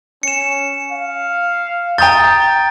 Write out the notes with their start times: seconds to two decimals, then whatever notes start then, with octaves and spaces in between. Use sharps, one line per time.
0.23 C#4 C#7 E7
0.91 F5
1.98 G5 A#5 D#6 G6 A6